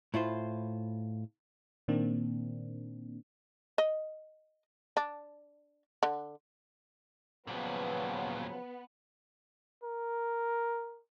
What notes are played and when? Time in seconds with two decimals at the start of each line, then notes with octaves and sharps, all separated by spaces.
0.14 A2 E4 F4 C5
1.88 A#2 D#3 A#3 C4 D4
3.78 D#5
4.97 D4
6.03 D3
7.47 D#2 A#2 C#3 F3 F#3 B3
9.84 A#4